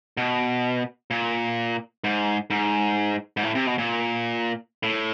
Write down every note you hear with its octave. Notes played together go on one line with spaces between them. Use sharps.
B2
A#2
G#2
G#2
G#2
A2
C3
B2
A#2
A2